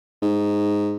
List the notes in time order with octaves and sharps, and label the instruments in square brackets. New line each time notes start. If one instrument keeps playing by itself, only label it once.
[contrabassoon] G#2